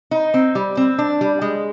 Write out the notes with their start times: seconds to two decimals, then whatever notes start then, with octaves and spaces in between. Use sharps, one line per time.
0.11 D#4
0.34 C4
0.55 G3
0.77 C4
0.98 D4
1.21 G3
1.42 G#3